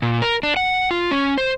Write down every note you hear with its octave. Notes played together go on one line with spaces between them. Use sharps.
A#2
A#4
D4
F#5
F4
C#4
C5